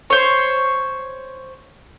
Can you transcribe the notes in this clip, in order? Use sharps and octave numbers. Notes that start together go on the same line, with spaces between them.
C5 C#5